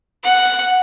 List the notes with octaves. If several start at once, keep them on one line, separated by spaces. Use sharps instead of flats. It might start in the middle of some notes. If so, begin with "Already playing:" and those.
F#5